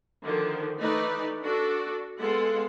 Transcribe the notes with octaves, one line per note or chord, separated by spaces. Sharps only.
D3 D#3 F3
E3 A3 D#4 B4 D5
D4 F#4 A4
G#3 B3 F4 A4 F#5